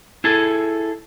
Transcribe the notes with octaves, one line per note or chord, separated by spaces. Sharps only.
E4 G#4 A4